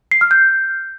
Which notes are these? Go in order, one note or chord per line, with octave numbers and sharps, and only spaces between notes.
C7
F6
G6